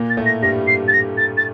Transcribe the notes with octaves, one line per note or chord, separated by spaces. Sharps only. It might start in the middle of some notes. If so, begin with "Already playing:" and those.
Already playing: A#2 A#3
A6
A2 A3
A#6
G2 G3 A#6
C7
A6
A#6
A6
A6